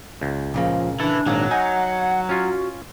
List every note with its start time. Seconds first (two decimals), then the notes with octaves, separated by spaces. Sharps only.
0.21 C#2
0.54 A#2 C#3 F3 A#3
1.00 E3 D4 A4
1.26 G#1 A#2 F#3
1.51 D#4 F#5 G#5
2.29 C#4 F4 F#4